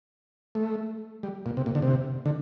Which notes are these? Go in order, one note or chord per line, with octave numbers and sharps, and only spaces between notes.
A3
G3
A#2
C3
A#2
D3
C3
D3